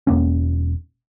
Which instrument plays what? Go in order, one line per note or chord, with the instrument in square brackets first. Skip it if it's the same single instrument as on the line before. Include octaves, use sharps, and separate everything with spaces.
[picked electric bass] E1 A#3 C#4